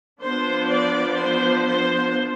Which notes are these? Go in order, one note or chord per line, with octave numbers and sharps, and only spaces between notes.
F3 B3 D4 C5
D5
C5
C5